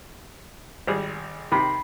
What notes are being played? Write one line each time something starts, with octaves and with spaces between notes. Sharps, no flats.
G#1 G3 G#4
C3 D#3 B5 C7